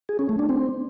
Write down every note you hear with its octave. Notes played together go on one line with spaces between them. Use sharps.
G#4
C#4
A3
D4
C4